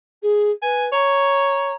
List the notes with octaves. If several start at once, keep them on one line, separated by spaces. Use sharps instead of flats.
G#4
B4 G#5
C#5 A#5